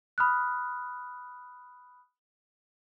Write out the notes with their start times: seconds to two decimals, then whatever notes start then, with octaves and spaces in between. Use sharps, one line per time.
0.18 B5 D#6 F6 F#6